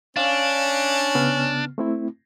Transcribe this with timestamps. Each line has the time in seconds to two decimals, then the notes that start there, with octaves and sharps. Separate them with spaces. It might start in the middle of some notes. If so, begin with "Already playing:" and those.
0.17 C#4 D4 F5
1.15 C#3 B3 F6
1.78 A3 C4 E4